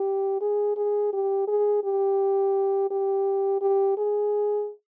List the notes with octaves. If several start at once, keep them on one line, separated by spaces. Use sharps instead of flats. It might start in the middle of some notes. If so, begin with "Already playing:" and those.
Already playing: G4
G#4
G#4
G4
G#4
G4
G4
G4
G#4